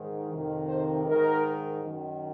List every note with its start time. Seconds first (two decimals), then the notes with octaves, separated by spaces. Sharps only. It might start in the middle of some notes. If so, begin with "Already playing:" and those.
Already playing: G#2 D#3
0.30 F2 C3 D#3
0.68 C5
1.06 G#2 D#3 A#4
1.81 F#2 D#3